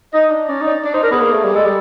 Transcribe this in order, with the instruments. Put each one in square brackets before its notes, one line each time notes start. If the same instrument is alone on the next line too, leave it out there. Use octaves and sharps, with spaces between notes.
[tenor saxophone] D#4 [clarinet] D#5
[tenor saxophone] D4
[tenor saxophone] C#4 [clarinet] D5
[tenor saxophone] D#4
[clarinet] D5
[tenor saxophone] D4 [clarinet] D5
[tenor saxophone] D#4 [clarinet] C5
[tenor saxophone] D4 [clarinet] A#4
[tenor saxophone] B3 [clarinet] G#4
[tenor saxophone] A#3
A3
G3
[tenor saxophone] G#3 [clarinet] A4
[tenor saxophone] G3